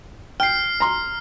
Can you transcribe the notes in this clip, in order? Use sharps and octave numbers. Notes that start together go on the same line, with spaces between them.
G5 F6 C7
A#5 C6